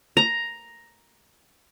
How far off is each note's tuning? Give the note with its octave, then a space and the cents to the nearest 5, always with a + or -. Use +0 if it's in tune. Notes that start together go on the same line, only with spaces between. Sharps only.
A#5 +5